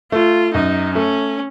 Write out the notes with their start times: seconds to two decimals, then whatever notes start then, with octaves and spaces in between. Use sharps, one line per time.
0.12 A3 F4
0.54 F#2 D#4
0.95 A3 C#4